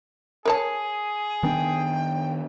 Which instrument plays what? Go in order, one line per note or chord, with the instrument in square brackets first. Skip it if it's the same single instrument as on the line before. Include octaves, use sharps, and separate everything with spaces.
[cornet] G#4 [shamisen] A#4 C#5 A5
[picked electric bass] D#3 B3 D4 [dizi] G5